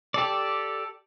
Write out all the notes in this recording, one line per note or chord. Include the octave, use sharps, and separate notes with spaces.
G4 A4 D5